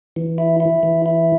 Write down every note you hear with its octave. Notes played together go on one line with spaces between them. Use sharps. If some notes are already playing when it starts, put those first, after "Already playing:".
E3
E4
E4
E3
E4